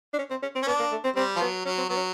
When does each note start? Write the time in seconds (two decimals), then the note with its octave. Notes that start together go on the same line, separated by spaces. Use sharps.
0.13 D4
0.18 C#4
0.30 C4
0.43 C#4
0.55 C4
0.62 C#4
0.67 B3 D4
0.79 A#3
0.92 A3
1.04 C4
1.16 G3 C4
1.36 F3
1.41 F#3 B3
1.65 F#3 C#4
1.78 C4
1.89 F#3 B3
1.97 C#4